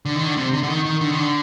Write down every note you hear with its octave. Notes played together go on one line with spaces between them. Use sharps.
D3
D#3
D3
C3
D3
D3
D#3
D#3
D3
D#3
D3